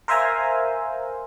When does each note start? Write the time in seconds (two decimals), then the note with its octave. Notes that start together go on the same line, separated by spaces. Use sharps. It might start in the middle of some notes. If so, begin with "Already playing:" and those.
0.08 A#4 C5 E5 F5 G#5 A#5